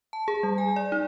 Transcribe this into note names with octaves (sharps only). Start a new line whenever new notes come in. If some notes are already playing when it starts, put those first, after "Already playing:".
A5
G#4
G3
G#5
D5
D#4